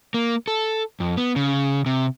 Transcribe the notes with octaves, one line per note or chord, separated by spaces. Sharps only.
A#3
A4
F2
B3
C#3
C3